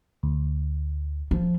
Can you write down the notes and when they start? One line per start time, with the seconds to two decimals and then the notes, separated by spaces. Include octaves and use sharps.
0.23 D2
1.31 F3